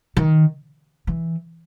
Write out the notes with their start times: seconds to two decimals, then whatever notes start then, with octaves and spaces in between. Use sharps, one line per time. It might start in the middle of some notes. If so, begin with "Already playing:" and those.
0.17 D#3
1.07 E3